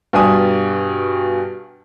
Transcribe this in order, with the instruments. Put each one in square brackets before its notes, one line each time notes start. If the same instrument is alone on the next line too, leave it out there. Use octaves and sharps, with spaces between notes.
[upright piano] G2 B2 D4 G4 G#5 D#6